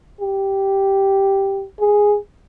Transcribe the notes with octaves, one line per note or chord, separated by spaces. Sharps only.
G4
G#4